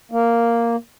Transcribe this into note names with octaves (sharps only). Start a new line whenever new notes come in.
A#3